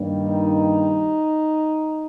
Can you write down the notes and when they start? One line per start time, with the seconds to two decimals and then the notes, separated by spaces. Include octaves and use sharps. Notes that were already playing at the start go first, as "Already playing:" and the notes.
Already playing: G2 D#3 G3 A#3
0.25 D#4